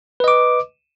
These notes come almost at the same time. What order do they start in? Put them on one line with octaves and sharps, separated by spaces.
B4 D#5 D6